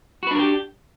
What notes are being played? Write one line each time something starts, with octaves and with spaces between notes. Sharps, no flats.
D4 F#4 G4 A#4 B4